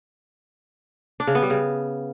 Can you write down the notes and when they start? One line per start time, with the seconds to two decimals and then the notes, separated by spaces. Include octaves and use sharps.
1.20 D4
1.27 C#3
1.35 B3
1.43 G3
1.50 C#3